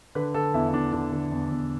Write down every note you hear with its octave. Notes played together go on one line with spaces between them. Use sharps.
D3 B4
D3 A4
E2 E4
E4
E2 D4
D3 D4
D3
E2
E2